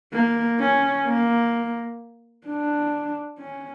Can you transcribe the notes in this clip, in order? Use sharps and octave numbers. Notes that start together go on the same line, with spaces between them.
A#3
C#4
A#3
D4
C#4